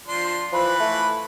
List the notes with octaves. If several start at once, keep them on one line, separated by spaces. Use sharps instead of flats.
F3 D4 C6
E3 F3 B4 B5
A3